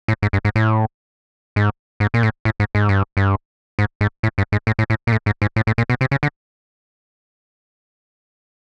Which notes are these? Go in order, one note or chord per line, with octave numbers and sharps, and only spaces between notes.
A2
G#2
G2
G#2
A2
G#2
G#2
A#2
A2
A2
G#2
G#2
G2
G2
G#2
G#2
A2
G2
G#2
A2
A2
A2
A#2
A2
G#2
G#2
A2
A2
A#2
B2
C3
C#3
D3